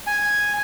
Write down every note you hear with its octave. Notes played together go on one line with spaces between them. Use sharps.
G#5